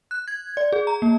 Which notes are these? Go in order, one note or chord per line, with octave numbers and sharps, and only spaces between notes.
F#6
G#6
D5
G#4
A#5
A#3